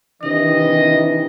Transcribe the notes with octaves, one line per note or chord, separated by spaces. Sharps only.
C3 D#3 E3 D4 D#5